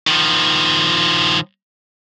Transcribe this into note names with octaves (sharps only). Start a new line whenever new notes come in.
D#3 F3